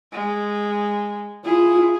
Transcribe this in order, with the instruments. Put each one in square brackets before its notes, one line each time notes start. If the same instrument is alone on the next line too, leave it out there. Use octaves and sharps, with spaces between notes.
[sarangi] G#3
[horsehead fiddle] E4 F4 [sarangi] G#4